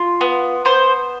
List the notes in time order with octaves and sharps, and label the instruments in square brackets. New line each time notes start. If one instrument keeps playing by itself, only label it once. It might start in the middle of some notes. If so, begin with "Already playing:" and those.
Already playing: [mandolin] F4
B3
B3 C5